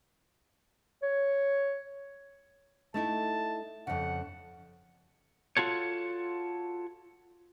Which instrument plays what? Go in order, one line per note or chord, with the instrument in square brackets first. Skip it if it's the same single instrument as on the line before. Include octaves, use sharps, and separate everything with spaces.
[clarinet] C#5
[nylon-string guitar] A3 D#4 E4 [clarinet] A5
[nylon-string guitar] F2 C#3 [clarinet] F#5
[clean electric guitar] F4 F#4 A4 C#5